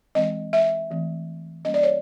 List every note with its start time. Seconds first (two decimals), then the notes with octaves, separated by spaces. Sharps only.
0.15 E3 G#3 C4 D#5
0.53 E5
0.90 E3 A3 C4
1.65 G3 A#3 C#4 D#5
1.74 D5
1.83 C#5